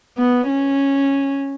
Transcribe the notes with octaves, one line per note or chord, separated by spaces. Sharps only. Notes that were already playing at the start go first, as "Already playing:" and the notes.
B3
C#4